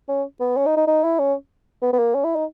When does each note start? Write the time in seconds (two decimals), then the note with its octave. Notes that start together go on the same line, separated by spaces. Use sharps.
0.09 C#4
0.40 B3
0.57 C#4
0.66 D#4
0.77 D#4
0.87 D#4
1.04 E4
1.19 C#4
1.82 B3
1.93 B3
1.99 A#3
2.15 C#4
2.24 E4
2.35 D#4